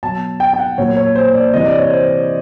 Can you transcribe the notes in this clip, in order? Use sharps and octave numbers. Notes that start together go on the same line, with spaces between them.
B2 F#3 A5
G5
G5
F#5
A#2 F#3 C#5
C#5
C5
D5
C3 E3 D#5
D5
C#5
C5